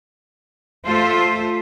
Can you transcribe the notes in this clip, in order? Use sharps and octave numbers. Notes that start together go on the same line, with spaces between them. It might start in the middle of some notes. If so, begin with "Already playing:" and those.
A3 F4 A4 C5 E5